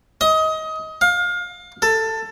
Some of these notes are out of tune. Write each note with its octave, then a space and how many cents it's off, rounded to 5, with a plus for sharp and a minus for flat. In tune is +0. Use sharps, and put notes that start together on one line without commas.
D#5 +25
F5 +25
A4 +15